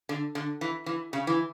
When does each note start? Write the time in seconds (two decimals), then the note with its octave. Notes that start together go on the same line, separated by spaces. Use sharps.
0.09 D3
0.35 D3
0.61 E3
0.86 E3
1.13 C#3
1.27 E3